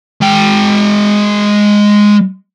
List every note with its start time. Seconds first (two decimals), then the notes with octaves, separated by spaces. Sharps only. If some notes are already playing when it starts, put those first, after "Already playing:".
0.21 G#3 G5